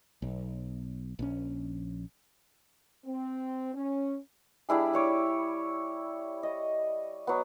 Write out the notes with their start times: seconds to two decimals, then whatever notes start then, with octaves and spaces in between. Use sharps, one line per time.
0.22 B1
1.19 A#1 C#4
3.05 C4
3.74 C#4
4.69 G3 D4 E4 G#4
4.93 G3 C#5 D6
6.43 D#5
7.27 F#3 B3